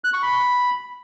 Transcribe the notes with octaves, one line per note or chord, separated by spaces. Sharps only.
F#6
C#6
B5